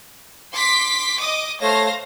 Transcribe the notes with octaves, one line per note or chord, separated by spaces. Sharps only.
C6 D6 B6
D#5 D6 D#6
A3 C5 C#5 F5 A#6